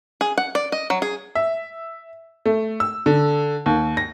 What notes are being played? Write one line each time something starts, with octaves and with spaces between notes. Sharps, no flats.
G#4
F#5
D5
D#5
F#3
G#4
E5
A3
E6
D3
D#2
A#6